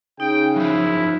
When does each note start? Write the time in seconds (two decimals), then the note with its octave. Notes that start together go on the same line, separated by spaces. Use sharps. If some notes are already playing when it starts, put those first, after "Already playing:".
0.20 C#3 D#4 G5
0.56 F#2 F3 E4